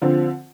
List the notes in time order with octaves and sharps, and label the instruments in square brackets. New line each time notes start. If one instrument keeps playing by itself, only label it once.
[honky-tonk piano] D3 F3 C4